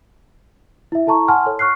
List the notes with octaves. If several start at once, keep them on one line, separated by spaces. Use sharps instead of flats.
E4 E5
E4 A4 A5 A#5 C#6
F#5 G#5 A5 C6 F6
A4 C#5
C#6 F6 F#6 C7